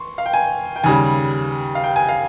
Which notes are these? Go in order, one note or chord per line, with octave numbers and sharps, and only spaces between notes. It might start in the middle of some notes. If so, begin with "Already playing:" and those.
Already playing: C6 C#6
F5
G5
G#5
G5
D#2 C#3 G3 G#5
F5
G5
G#5
F5